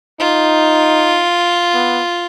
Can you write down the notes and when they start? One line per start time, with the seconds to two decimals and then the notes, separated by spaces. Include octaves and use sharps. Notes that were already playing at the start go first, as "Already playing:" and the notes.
0.20 D#4 F4
1.74 B3